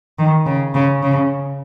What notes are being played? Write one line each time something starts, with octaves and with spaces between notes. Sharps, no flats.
D#3
C#3
C#3
C#3